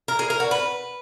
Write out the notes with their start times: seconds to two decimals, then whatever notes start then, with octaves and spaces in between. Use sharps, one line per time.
0.08 A#4
0.19 G#4
0.30 A#4
0.40 F#4
0.51 B4